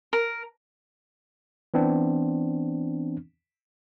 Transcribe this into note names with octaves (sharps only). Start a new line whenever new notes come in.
A#4
E3 B3 C4 D4